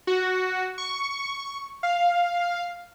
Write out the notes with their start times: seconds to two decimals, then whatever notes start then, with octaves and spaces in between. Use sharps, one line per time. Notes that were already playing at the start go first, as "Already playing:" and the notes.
0.07 F#4
0.78 C#6
1.83 F5